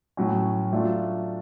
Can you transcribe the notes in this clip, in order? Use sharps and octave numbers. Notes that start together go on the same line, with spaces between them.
A2 F#3 C#4
F#3 A3 D4 F4